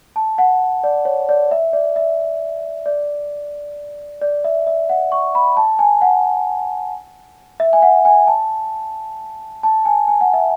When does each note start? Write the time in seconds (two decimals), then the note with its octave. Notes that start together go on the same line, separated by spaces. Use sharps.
0.16 A5
0.38 F#5
0.84 D5
1.05 C#5
1.29 D5
1.51 E5
1.73 D5
1.96 E5
2.86 D5
4.21 D5
4.44 E5
4.67 E5
4.89 F#5
5.12 C#6
5.35 B5
5.57 A5
5.79 G#5
6.01 F#5
7.60 E5
7.73 G#5
7.82 F#5
8.05 G#5
8.27 A5
9.63 A5
9.85 G#5
10.08 G#5
10.21 F#5
10.34 E5